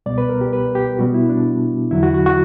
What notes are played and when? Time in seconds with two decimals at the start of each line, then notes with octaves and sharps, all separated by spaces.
0.06 C#2 B2 G3 B3 D5
0.18 B4
0.29 A#4
0.41 G4
0.53 B4
0.75 G4
0.99 B2 G3 B3 F#4
1.14 E4
1.29 D4
1.91 E2 D3 F#3 E4
2.03 F#4
2.14 F#4
2.26 F#4